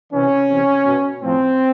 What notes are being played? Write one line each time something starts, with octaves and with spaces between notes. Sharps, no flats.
C3 E3 C#4
C3 E3
B2
A2 F3 C4